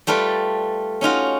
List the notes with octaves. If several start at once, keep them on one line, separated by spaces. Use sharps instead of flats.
G3 A3 F4 B4 D5
C#4 D#4 F4 F#4